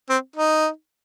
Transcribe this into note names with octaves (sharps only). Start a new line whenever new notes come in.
C4
D#4